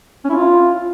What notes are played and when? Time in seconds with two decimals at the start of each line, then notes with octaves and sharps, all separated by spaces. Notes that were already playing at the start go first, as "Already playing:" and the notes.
0.25 C#4
0.30 E4
0.35 F4